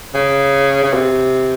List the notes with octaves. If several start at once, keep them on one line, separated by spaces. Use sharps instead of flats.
C#3
C#3
C3